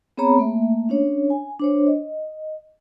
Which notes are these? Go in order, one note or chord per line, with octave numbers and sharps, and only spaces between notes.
B3 C4 G#4 C#5 A#5 B5
A3 A#3 E5
C#4 D4 C#5
G#5
D4 C5 C#5
D#5